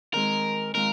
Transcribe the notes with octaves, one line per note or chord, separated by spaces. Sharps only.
D#3 G#3 C4 D#4 G#4 A#4
D#3 G#3 C4 F4 A#4